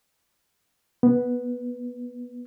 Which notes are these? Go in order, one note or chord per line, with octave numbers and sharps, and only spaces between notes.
B3